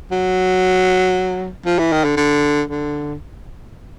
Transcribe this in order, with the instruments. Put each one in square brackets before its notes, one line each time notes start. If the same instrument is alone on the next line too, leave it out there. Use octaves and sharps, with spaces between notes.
[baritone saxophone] F#3
F3
E3
D#3
D3
D3
D3